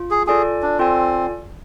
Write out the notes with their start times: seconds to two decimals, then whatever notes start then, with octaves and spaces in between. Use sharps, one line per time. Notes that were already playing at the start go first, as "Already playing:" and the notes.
Already playing: F4
0.11 G#4
0.27 F4 G#4 A4 D5 G#5
0.63 D4
0.79 C4 F4 A4 D5 G#5